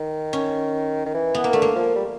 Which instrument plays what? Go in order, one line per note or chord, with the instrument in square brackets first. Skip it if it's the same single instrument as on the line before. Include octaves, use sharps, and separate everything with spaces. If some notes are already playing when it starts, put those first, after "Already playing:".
Already playing: [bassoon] D#3
[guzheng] C#4
[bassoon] D#3
E3
[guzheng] B3
A#3
[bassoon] D3 [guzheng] A3
[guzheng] A#3
[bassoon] F3
G3